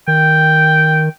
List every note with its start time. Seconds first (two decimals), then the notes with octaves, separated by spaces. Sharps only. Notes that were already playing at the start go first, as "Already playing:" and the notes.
0.08 D#3 G5